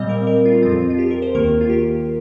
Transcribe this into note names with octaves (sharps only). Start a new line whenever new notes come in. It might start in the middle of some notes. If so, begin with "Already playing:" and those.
Already playing: A#2 G3 C4 D#5
A#4
A#4
F4
F2 F3 C4 F4
F4
G4
A#4
C5
D#2 D#3 A#3 A#4
F4
G4